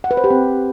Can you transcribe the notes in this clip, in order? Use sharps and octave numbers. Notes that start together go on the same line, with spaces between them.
F#5
B4
C5
G4
C4